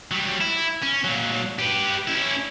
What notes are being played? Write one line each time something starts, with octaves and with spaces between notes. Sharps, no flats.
F#3 G3
E4
C#4
A#2 F#3
G4 B4
C#4 E4